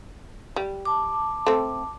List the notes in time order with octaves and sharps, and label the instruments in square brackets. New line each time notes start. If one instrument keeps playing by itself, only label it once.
[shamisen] G3
[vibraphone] A5 D6
[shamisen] A3 C4